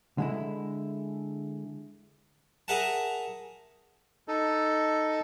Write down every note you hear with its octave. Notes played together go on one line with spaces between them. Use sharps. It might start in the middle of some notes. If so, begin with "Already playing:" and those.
D3 G#3 E4
G#4 A#4 E5 F#5 A5
D#4 A4